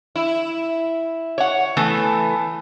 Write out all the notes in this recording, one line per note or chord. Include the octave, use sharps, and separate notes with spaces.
E4
C#5 F#5
E3 A3 B3